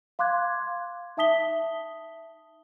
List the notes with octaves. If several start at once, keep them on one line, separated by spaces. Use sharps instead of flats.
F5 C6 D6 F#6 G#6
D#4 E5 A5 D#6 B6 G7